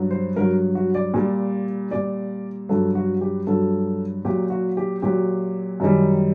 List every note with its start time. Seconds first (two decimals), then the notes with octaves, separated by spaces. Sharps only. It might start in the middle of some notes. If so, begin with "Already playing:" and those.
Already playing: G2 F#3
0.11 C5
0.36 G2 F#3 A#4
0.75 F#4
0.95 D5
1.14 A#2 G3
1.91 A#2 G3 D5
2.69 G2 F#3 A4
2.95 F#4
3.21 G4
3.47 G2 F#3 A4
4.25 A#2 F#3 G4
4.50 F#4
4.77 G4
5.02 A#2 F#3 G4
5.80 F#2 D#3 G3